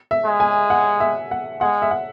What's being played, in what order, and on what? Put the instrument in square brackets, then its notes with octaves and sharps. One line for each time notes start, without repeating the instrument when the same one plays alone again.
[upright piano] E5
[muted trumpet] G#3
[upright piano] G#5
F#5
E5
F#5
[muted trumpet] G#3 [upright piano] F#5
[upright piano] E5
F#5